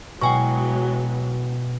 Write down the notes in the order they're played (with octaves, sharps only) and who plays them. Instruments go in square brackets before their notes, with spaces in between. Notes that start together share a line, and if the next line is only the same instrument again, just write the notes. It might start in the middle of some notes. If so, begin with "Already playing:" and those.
[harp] B2 [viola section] E3 F#3 G#3 [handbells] G5 G#5 C#6